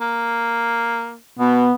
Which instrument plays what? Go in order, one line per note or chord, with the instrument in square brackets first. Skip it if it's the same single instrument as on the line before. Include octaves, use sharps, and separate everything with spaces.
[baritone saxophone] A#3
[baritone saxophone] B2 [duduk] B3